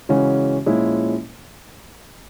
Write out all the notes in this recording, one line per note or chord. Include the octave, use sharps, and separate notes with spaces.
C#3 E3 G#3 C#4 F#4
A#2 F3 G#3 C#4 E4